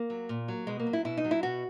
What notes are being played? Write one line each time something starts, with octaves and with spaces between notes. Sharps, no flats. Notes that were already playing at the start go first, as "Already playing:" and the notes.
Already playing: A#3
F#3
A#2
F#3
B2 G#3
A#3
F#3
E4
B2 E4
D#4
F#3
E4
B2 F#4